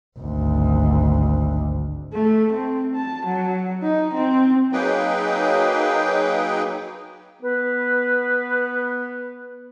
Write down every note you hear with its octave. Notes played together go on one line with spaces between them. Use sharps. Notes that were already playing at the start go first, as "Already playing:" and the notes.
G#1 D2
A3
C4
A5
F#3
D#4
C4
F#3 A#3 D#4 G#4 B4 G5
B3 B4